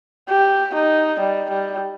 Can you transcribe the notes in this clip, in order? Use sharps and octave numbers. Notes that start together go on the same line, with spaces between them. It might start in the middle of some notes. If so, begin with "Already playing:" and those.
G4
D#4
G3
G3